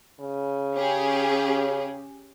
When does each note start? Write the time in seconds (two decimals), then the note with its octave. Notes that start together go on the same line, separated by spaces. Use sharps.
0.20 C#3
0.76 C#4 G4 G#4